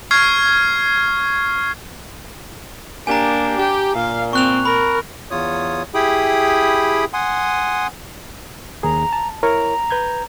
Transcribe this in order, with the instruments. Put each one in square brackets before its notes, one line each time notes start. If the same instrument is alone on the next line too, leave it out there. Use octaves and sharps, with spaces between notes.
[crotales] C#6 F6 G#6 C7
[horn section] A#3 G4 [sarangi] D4 [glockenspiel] G#5 A#5
[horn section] G4
[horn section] A#2 [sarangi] F5
[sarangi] C4 [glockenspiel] C#6 F#6 F7
[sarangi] A#4 [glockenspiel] B5
[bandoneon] E2 F4 C#5 D#6
E4 G4 G#4 G5 B5 D#6
F#5 G#5 C6 D#6
[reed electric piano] D#2 G#4 [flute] A#5
[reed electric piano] A5
[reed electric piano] E4 A#4 C#5 [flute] A#5
[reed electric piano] B4 G6 G#6